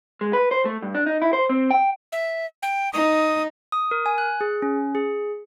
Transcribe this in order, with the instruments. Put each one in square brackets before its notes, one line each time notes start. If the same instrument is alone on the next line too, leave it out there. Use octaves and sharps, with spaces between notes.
[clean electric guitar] G#3
B4
C5
A3
G2
D4
D#4
E4
C5
C4
G5
[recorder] E5
G5
[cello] D#4 [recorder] D#6
[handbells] D#6
A#4
G#5
F#6
G#4
C#4
G#4